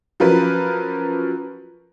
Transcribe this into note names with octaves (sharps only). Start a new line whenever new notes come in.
F3 F#3 C#4 A#4 B4